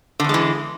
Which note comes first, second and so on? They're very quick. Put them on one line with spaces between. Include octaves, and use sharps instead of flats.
D3 E2 G#3 E3